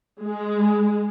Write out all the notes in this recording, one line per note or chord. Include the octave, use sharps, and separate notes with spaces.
G#3